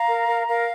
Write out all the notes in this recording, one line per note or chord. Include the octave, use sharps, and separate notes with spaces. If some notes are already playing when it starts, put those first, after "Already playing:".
Already playing: F5 A#5
A#4
A#4
A#4 F5